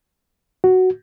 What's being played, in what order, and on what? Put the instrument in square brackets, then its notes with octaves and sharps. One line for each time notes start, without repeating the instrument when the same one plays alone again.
[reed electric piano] F#4